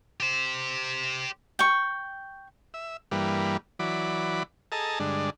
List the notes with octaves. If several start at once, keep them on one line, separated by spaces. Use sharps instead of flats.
G4 C5
G5 C#6
E5
G2 E3 G3 A#3 B4
E3 F#3 D5 B5
G#4 A4 D#5 A5 A#5
G2 D3 G#3 D4